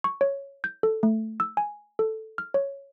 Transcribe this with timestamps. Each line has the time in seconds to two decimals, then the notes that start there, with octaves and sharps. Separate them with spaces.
0.04 C#6
0.21 C#5
0.64 G6
0.83 A4
1.03 A3
1.40 E6
1.57 G#5
1.99 A4
2.38 F6
2.54 C#5